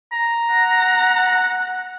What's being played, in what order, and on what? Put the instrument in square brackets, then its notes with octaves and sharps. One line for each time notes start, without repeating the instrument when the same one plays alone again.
[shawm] A#5
[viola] F#5